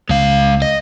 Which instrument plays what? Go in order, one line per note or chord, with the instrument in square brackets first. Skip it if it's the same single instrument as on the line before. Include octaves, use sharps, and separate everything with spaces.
[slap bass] C#2 [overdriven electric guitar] G#3 F5
[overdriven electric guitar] D#5